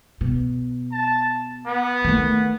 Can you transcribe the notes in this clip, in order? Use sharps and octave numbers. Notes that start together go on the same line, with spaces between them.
B2
A5
B3
D#3 A3